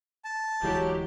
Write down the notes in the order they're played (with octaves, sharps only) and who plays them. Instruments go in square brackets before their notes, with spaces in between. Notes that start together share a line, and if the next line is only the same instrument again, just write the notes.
[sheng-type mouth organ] A5
[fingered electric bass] D1 E3 G#3 [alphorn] F#3 [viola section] G4